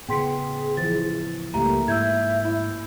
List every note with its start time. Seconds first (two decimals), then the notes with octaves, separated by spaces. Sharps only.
0.09 A2 C#3 B3 G#4 G5 C6 B6
0.77 E3 F3 A6
1.54 C#2 F#3 G3 A3 A#3 G4 A#5
1.88 G#2 E4 E5 E6 G6 G#6
2.45 E4